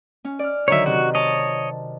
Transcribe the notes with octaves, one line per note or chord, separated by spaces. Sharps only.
C#4
D5 F6
D3 D#3 F#3 C#5 E5
C3 F#4
C#5 D#5 A5